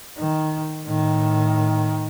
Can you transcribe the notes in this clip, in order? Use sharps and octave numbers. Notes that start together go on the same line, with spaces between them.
D#3
A2 D#3